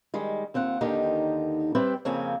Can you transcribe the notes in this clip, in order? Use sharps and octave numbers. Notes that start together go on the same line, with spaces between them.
D#3 G3 G#3
D#2 C4 F4 F#5
D#2 D3 D#3 D#4 G4
G3 C4 B4 D5 E5 G5
F2 C#3 F3 A#3 C4 G#5